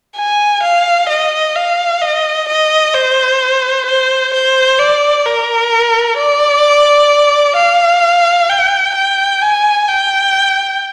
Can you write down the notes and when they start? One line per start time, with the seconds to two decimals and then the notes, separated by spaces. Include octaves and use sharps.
0.17 G#5
0.63 F5
1.09 D#5
1.56 F5
2.02 D#5
2.48 D#5
2.94 C5
3.86 C5
4.33 C5
4.79 D5
5.25 A#4
6.18 D5
7.56 F5
8.49 G5
8.95 G5
9.42 G#5
9.88 G5